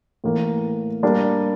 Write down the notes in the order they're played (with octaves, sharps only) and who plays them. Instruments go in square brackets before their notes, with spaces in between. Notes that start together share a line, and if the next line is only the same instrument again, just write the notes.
[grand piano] A2 E3 A#3
G3 A#3 D4